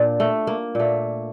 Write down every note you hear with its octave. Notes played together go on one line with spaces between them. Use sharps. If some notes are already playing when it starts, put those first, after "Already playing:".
Already playing: A#2 D4 F4
A3
A#3
A#2 A3